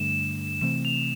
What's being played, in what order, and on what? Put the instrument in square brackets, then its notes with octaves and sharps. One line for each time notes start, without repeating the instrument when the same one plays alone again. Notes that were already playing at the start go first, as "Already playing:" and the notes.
Already playing: [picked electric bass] G2 D3 A3 [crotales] E7
[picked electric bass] C3 E3 A3 C4 [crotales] E7
[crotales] F7